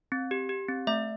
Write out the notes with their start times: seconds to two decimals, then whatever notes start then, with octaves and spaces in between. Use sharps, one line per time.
0.12 C4
0.31 G4
0.49 G4
0.68 C4
0.87 A3 E5